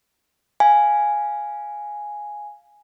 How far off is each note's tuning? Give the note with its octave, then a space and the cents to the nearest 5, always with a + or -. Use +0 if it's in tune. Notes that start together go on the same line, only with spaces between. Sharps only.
F5 +0 G#5 +0